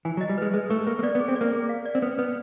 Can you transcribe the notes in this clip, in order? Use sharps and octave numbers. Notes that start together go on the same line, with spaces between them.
E3 G#5
F#3
D#5
G3
G#3 B4
G#3 B4
A3 C#6
A#3 C#6
A#3
B3 D5
B3
G#4
C4
D5
A#3
G#4
F5
D5
C4
B3 B4
B3 B4